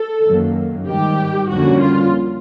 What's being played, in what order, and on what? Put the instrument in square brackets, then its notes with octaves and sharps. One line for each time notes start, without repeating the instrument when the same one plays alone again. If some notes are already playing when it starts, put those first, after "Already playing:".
Already playing: [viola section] A4
[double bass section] F#2 D#3 F#3 A#3
[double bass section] G#2 D#3 G3 [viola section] G4
[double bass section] F2 D3 G3 A#3 C#4 [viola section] F#4
[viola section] F4